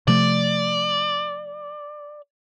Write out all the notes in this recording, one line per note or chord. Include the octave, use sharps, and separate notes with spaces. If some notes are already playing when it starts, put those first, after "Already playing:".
C3 F3 A3 D5